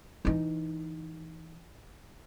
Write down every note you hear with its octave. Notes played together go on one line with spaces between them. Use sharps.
E3 D#4